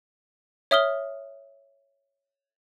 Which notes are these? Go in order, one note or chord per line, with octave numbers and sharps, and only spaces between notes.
C#5 E5 D#6 F6 G7